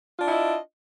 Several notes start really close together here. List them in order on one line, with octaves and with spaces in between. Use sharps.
F4 D4 E4 D#5